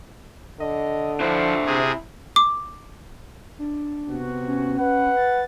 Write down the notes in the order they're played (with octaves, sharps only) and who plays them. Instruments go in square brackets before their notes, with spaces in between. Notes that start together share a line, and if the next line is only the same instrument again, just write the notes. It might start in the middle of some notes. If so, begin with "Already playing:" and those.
[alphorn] D3 [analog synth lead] D#5
[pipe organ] F3 [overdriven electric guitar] D4 C5 [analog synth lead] E4
[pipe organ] C3 G#4
[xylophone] D6
[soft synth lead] D4
[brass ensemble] C3 B3 F#4
[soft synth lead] C#4
[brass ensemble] B4 [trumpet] F#5
[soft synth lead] A6